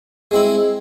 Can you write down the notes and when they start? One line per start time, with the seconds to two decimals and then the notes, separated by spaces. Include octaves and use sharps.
0.31 G#3 C4 E4